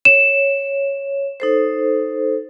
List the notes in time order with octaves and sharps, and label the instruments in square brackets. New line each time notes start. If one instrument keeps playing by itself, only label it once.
[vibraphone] C#5 [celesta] E7
[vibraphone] D#4 A4 C5